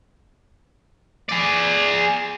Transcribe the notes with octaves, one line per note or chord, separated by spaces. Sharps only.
G#4 D5